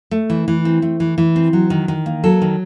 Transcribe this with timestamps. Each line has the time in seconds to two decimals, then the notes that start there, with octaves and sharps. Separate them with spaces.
0.11 A3
0.30 E3
0.48 E3
0.65 C4
0.82 A3
1.00 E3
1.18 E3
1.36 C4
1.53 F#3
1.70 D#3
1.88 D#3
2.06 A#3
2.24 F#3 A4
2.42 D#3